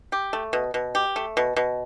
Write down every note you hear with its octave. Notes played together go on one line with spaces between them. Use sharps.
G4
A3
B2
B2
G4
A3
B2
B2